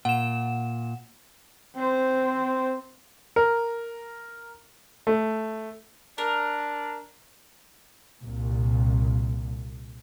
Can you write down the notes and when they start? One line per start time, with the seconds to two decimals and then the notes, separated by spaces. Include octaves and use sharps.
0.05 A#2 F#5 E7
1.75 C4 C5
3.36 A#4
5.07 A3
6.18 D4 A#4
8.21 C2 A#2